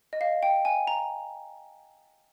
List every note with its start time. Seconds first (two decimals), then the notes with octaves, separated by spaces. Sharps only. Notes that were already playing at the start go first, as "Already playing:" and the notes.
0.13 D#5
0.21 F5
0.43 G5
0.65 G#5
0.87 A#5